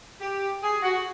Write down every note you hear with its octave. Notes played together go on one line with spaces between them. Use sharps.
G4
G#4
F#4